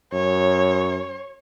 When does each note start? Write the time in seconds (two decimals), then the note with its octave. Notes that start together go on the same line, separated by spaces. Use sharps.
0.13 F#2 C#5